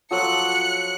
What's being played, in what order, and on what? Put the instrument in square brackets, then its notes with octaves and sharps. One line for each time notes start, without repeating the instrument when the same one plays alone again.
[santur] F3 F#3 A4 [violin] F#6 C#7